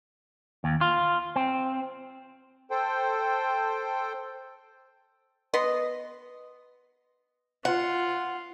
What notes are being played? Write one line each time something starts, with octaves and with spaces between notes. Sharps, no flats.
D#2
F4
C4
A4 C5 G5
B3 B4 D#5 C6
F4 F#5